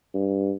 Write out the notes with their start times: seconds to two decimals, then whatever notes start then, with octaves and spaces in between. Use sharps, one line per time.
0.14 G2